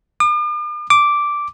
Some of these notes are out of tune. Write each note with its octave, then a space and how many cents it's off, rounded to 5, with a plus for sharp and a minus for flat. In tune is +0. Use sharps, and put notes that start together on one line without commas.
D6 +45
D6 -5